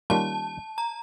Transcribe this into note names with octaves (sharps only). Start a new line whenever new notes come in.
D#3 G3 A#3 C#4 F4 A5
A#5